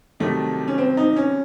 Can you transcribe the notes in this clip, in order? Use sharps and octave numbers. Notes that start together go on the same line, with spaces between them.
C2 C3 D#3 F#3 A3
C#4
C4
D#4
C#4